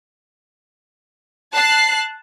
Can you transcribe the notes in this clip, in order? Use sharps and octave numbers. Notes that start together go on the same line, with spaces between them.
A5 F#6 C7